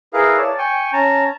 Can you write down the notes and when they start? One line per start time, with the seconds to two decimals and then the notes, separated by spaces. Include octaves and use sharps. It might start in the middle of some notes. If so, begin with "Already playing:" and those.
0.14 E4 G#4 A#4 B4 F5
0.37 C#5 D5 A5
0.58 G5 G#5 C#6
0.93 C#4 A5 A#5